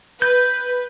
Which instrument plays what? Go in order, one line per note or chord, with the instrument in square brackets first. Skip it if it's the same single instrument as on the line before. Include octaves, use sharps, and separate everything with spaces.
[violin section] B4 [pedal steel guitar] G6